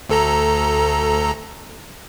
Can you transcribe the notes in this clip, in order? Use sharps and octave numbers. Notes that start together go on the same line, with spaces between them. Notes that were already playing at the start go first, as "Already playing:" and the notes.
D2 A4 A#5